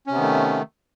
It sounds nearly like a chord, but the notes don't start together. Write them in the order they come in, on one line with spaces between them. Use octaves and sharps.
C#4 C3 B3 D#3 A3